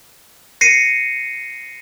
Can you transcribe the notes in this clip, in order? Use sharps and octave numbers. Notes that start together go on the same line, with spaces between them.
A#6 C7 C#7 D#7